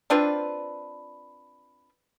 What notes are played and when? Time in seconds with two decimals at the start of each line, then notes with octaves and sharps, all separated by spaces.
0.10 C4 D4 F4 B4